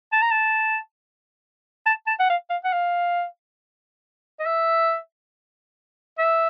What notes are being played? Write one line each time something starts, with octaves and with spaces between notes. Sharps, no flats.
A5
A#5
A5
A5
A5
F#5
F5
F5
F#5
F5
D#5
E5
E5